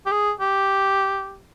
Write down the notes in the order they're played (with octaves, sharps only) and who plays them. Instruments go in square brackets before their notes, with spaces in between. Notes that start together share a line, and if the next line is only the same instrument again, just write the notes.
[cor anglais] G4
G#4
G4